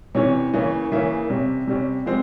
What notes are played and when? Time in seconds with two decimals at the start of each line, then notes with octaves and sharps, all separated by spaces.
0.15 C3 E3 G3 C#4 C#5
0.53 C#3 E3 A#3 C#4
0.92 C#3 E3 A#3 C#4 E5
1.29 C3 G3 C#4
1.67 C3 G3 C#4
2.06 F3 G#3 C4